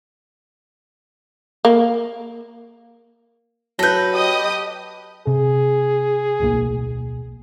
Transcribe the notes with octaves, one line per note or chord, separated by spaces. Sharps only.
A#3
F#3 A4 B4 G6 A#6
G4 D#5 D#6
C3 G#4
D1 B1 A#3